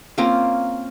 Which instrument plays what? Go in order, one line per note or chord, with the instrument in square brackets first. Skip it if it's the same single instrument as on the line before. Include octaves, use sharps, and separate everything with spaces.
[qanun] A#3 C4 C#4 F4